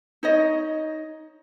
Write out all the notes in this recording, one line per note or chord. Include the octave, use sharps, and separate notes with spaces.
D#4 C#5 D#5